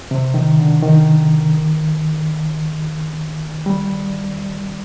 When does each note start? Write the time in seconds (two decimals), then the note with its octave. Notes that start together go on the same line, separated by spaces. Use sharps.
0.11 C3
0.34 D#3
0.58 D3
0.82 D#3
3.66 G3